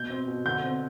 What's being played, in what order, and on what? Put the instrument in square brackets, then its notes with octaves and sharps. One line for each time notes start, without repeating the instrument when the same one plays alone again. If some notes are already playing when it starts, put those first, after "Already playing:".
Already playing: [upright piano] B2 G6
C4
B2
D3 G6
C4